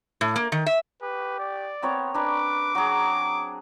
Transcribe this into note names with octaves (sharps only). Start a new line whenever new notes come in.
A2
A#3
D#3
E5
G4 B4
D5
B3 C4 A#4 C#5
D4 A#4 B4 D6
F#3 G#4 A#5